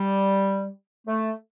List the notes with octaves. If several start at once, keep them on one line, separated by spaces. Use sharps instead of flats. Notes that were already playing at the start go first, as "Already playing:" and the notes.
Already playing: G3
A3